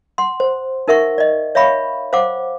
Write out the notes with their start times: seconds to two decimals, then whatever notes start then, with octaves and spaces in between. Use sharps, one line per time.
0.18 F#5 C6
0.40 C5
0.88 D#4 A#4 E5 F#5 C#6
1.18 D5 D#5
1.55 C#5 E5 F5 B5 C#6
2.13 C5 F5 F#5 D6